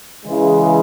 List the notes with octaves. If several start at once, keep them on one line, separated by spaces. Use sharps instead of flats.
C#3 E3 G#3